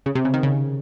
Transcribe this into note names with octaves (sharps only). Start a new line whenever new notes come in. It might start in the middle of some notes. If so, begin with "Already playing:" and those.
C#3
C3
C#3
D#3
C#3